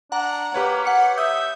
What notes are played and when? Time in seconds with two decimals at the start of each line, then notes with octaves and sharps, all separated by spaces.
0.12 D4 F#5 A#5
0.54 A#3 G4 B4 C#5
0.85 F#5 C#7
1.18 E5 D#6 G6